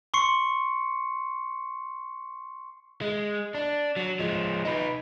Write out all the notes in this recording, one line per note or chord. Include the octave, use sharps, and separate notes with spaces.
C6 C#6 C7 C#7
G#3
D4
F#3
F3 G#3
D#4 B4